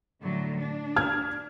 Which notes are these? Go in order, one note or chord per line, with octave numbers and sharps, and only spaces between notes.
A2 D3 F#3
D4
F6 G#6